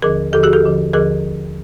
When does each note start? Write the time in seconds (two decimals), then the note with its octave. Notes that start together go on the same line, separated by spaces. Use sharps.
0.02 D#2 D3 F3 G#4 A#4
0.32 D#2 D3 F3 G4 A4
0.43 F#4 G#4
0.53 G4 A4
0.63 D#2 D3 F3
0.93 D#2 D3 F3 G#4 A#4